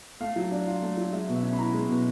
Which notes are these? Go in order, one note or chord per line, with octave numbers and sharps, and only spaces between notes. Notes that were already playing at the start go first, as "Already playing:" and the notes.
A3 F5
F#3
D4
F4
A3
F#3
G#3 E5
B2
E5
C#4
B5
E4 A#5
G#3
B2